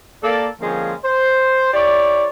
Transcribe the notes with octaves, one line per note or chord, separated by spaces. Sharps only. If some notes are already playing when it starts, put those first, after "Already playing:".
A#3 A4 D5
D3 F3 G#3 A#3 C4 C#4
C5
E4 G4 C#5 D5